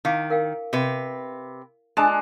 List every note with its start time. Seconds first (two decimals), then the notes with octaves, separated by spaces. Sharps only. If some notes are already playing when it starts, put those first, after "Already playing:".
0.05 D#3 E4 F5 D6
0.30 A#4 F5 G5
0.73 C3 B4
1.97 G#3 D4 A5